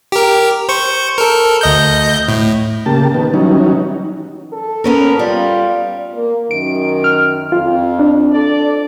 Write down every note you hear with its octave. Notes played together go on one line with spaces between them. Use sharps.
G4 A#4
C5 C#6
A4 A#4
D2 D#5 G6
A2
C#3 A#3 G4 A5
D#3 B3
E3 F#3 G3 C#4 D#4
A4
B3 C#4 A#4
G3 F4
A#3
F#2 D#3 D7
F6
F2 F4
D4
A4 D5